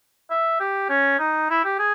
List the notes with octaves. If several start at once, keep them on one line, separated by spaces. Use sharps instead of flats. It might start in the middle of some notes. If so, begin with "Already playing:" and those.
E5
G4
C#4
D#4
E4
G4
G#4